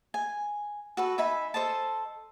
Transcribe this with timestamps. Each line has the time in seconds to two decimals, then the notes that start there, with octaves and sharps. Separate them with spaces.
0.14 G#5
0.97 F#4 A4 B4
1.18 D#4 E5 G#5 B5
1.54 A4 C5 D#5 A5